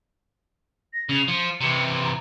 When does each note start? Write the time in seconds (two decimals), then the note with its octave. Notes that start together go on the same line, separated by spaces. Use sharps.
0.93 A#6
1.09 C#3 F7
1.28 F3 C#7
1.61 C3 E3
2.04 A#5